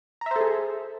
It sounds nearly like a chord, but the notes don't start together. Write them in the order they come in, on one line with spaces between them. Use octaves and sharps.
A#5 E5 C5 A4 G#4